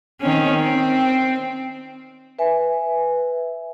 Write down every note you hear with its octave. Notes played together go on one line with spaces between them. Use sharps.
D#3 C4 C#4
C4
B4 E5 G#5